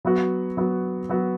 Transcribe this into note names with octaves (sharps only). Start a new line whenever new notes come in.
F#3 B3 F#4
F#3 B3 F#4
F#3 B3 F#4